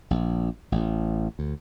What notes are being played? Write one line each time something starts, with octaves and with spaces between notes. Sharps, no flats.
A#1
A1
D2